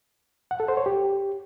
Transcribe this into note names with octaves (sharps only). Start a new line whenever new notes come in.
F#5
A4
C5
C#5
G4